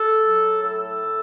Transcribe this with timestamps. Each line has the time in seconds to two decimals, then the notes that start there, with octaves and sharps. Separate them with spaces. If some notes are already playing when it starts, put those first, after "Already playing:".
Already playing: A4
0.20 F#3
0.62 A2 A4
1.05 A2